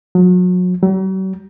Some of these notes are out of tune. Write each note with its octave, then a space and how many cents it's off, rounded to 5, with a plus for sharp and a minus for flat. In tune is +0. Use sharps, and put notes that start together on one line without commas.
F#3 -35
F#3 +45